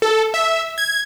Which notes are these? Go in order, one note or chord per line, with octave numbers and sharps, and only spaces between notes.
A4
E5
G#6